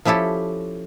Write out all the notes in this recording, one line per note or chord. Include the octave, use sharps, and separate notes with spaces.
F3 C#4 E4 G4 A4